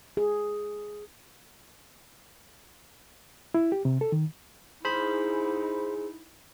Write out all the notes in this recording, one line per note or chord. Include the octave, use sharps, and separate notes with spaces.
G#4
E4
G4
C3
A4
D#3
G#2 D#4 E4 G#4 C5 B5